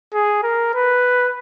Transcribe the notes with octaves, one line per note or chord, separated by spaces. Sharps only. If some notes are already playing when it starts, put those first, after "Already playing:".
G#4
A#4
B4